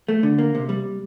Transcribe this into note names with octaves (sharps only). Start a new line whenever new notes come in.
A3
D3
A#3
C3
G3